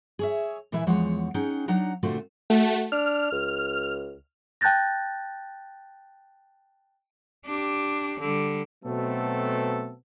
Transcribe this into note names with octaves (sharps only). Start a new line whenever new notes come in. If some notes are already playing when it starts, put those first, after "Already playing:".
G#4 C#5 E5
A#2 E3 E4 B4 E5 G#5
E2 F3 G#3 C#5 F#5
C#4 D#4 G#4 F#5 G5
F#3 D4 D#4 F#5 A#5
A#2 D3 A3 C4 F4 F#4
A3 F#4
D4 F6
C#2
G5 A5 F#6 G6 A6 A#6
D4 G4
D3 G3
B2 F#3 A3 B3 C4 A4